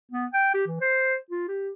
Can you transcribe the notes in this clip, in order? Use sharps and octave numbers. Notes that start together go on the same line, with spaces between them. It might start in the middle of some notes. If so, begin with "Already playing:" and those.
B3
G5
G4
E3
C5
F4
G4